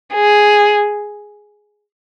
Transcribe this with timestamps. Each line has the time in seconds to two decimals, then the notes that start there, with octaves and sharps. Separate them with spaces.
0.14 G#4